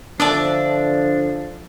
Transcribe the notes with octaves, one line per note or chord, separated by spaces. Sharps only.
D3 F3 D4 D5 E5 A5